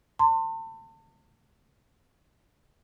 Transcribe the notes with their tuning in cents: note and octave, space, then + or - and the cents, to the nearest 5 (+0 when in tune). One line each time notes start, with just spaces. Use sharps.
A5 +40 C6 +0